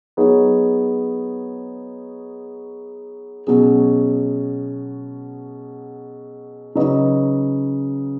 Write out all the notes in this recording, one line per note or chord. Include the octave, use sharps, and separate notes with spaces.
F#3 B3 D#4 G#4 C#5
B2 F#3 C#4 G#4
C#3 F#3 D#4 B4 D#5